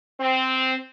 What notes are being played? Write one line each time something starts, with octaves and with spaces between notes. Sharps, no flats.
C4